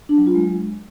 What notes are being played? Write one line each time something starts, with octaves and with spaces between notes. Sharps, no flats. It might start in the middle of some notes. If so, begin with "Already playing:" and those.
D4
F#3
F4
G#3